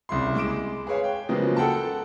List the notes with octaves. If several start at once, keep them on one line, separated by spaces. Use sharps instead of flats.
C2 C#3 E4 C6
G#3 D6 D7 E7
G#4 B4 C#5 F5
G5
C#3 F3 F#3 G#3 A#3 B3
A4 F#5 G5 A5